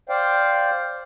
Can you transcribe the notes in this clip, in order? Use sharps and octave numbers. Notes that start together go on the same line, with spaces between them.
C5 D5 F5 G5